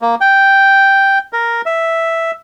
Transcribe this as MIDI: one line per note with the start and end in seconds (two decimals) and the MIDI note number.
0.02 0.15 58
0.21 1.18 79
1.33 1.61 70
1.66 2.31 76